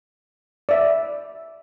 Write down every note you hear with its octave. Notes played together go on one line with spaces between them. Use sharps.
D5 E5